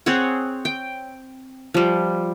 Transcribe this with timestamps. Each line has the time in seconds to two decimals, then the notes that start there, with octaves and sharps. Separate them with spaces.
0.06 C4 G#4 C#5 F#5
0.65 G5
1.74 F3 G3